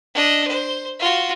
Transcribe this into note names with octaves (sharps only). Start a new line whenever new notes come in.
D4 D#5
C5
F4 F#4